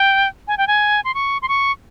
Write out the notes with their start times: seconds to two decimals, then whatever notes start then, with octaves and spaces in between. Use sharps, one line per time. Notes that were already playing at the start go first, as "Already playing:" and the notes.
Already playing: G5
0.48 G#5
0.58 G5
0.67 G#5
1.05 C6
1.14 C#6
1.42 C6
1.48 C#6